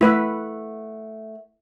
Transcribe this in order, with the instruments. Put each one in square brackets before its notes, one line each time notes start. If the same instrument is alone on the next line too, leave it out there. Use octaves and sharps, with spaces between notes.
[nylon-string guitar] A3 F#5 [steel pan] E4 B4 E5